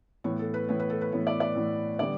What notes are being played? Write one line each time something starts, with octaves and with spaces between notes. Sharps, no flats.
A2 E3 B3 C#5
A4
B4
A2 E3 B3 C#5
B4
A4
B4
A2 E3 B3 C#5
D5
D5
A2 E3 B3
D3 G3 B3 D5